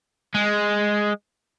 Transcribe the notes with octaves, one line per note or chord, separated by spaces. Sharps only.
G#3